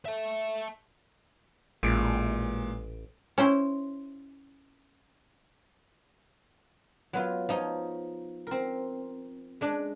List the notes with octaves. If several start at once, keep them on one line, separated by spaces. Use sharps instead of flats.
E5 A5
A1 A#2 G#3 D7
C#4 E4 C5
F#3 B3 F4
F3 D#4 C#5
C4 A#4
G#3 D4